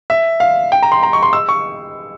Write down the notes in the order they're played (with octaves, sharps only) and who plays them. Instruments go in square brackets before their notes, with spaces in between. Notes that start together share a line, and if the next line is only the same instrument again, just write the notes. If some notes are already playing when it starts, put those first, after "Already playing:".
[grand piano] E5
F5
G5
A#5
C6
A#5
C#6
C6
E6
C#6